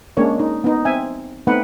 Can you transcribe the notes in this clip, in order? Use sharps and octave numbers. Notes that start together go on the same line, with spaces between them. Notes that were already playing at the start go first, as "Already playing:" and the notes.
G#3 A#3 C#4 D4 A#4 C#5
D#4
B3 D#4
C4 E5 G#5
A3 B3 C4 D#4 B4 F#5